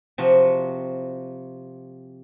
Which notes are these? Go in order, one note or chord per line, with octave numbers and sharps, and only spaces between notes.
C3 F3 F#4